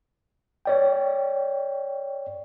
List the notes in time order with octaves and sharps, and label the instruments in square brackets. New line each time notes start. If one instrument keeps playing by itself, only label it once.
[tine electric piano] C#5 D5 G5